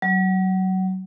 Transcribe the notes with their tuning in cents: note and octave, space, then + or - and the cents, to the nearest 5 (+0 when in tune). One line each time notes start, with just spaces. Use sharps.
F#3 +25